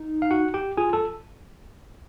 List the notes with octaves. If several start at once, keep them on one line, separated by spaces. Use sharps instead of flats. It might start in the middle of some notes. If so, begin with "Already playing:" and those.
Already playing: D#4
F5
F#4 F#5
G4 G5
F4 G#4 G#5
A4 A5